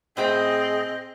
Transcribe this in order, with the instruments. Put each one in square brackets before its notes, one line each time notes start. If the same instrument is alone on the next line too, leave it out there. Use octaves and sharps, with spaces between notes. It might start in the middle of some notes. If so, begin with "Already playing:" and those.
[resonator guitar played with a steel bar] A2 C5 G5 [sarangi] C4 [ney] G#4 [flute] D#5